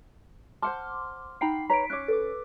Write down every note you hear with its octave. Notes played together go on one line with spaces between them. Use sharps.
C5 F#5 A5 C6 D6 F6
D#4 F#5 G5 A#5 B5 C7
B4 C#5 A#5 B6 D7
C#4 C#5 D6 F#6
A4 B4 D6